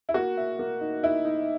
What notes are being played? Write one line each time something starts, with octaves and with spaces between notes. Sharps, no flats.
E4
A#3 F#4
E5
A#3
D#4
D#4 E4
D#4